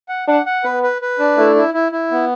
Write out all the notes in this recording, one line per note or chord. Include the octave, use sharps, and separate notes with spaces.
F#5
D4 F#5
F#5
B3 B4
B4
B4
D4
A3 E4
E4
E4
E4
B3